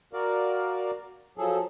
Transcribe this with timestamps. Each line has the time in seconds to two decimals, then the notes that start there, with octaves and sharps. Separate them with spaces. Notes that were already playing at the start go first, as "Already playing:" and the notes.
0.13 F#4 A#4 D5 F5
1.38 F3 F#3 G#4 A4